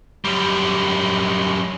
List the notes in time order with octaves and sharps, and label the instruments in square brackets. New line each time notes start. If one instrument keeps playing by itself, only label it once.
[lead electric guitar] F#2 G3